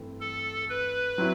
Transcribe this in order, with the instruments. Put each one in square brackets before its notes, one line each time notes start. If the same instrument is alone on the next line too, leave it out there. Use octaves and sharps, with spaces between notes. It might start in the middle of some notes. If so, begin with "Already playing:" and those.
Already playing: [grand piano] G2 E3 A3 C4
[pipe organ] A4
B4
[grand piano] F#3 C4 E4